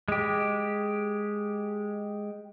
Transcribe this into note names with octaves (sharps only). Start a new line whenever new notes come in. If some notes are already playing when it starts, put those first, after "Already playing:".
G#3 G4